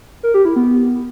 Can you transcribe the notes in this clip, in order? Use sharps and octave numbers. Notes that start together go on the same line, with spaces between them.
A#4
G4
E4
B3